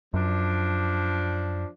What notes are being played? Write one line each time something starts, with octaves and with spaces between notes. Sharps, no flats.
F#2 F3 D4